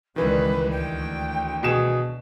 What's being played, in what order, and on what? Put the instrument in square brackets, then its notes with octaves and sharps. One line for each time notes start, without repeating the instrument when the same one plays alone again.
[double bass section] C#2 G3 [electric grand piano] D#3 E3 [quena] B4
[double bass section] D2 [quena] G5
[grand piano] B2 G#4 E7